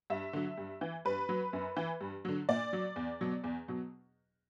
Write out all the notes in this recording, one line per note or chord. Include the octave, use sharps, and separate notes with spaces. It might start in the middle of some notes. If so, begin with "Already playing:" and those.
G2 E5
D3 F#3
G2
E3
G2 B4
F#3
F#2
E3
G2
D3 F#3
A#2 D5
F#3
E2
B2 F#3
E2
B2 F#3